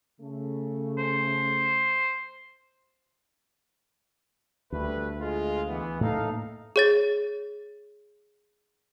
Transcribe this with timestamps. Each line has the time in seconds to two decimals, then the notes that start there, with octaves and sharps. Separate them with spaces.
0.21 C#3 A3
0.98 C5
4.72 D2 G3 A3 B4
5.20 G#3 F4
5.68 E3 B3
6.01 A2 A#3 D#4 A4 F5
6.76 G#4 C#5 A6